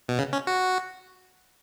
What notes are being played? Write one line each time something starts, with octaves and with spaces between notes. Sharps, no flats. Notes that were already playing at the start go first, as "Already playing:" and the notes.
B2
C#3
C#4
F#4